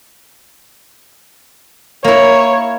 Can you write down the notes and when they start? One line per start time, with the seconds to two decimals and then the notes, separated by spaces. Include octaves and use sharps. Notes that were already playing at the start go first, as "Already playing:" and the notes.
2.04 A#3 E4 C#5